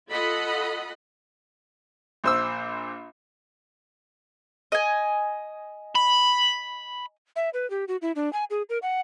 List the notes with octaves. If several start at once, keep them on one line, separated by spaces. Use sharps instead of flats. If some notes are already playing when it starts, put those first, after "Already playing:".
F4 A4 D#5 F#5 B5
A#1 C5 E6
D#5 G#5
B5
E5
B4
G4
F#4
E4
D4
G#5
G#4
A#4
F#5